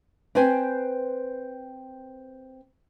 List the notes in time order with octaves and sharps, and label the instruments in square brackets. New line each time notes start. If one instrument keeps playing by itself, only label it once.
[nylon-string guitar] C4 B4 C5 G5 G#5